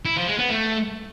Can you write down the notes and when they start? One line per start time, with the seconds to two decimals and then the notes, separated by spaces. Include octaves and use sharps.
0.05 E4
0.16 F3
0.28 G#3
0.39 B3
0.50 A3